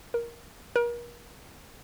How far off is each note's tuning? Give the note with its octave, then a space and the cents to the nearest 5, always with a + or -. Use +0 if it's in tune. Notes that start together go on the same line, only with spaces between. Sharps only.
A#4 +15
A#4 +40